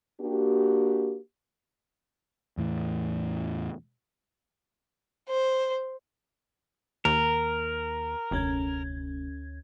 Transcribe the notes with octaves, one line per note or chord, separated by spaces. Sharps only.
A#3 D4 F#4 G4
E2 A2 E3
C5
D#2 A#4
F1 D2 C#4 G#6